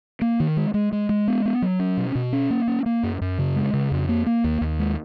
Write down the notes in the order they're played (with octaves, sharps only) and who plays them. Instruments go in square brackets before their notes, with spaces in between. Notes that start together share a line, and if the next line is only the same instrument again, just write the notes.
[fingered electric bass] A#3
D#3
G#3
G#3
G#3
G#3
B3
B3
F#3
C#4
B2
B2
C#4
A#3
C#4
A#3
F#2
F#2
C#3
G#3
C#3
F2
A#3
A#3
D#2
D#2
G#3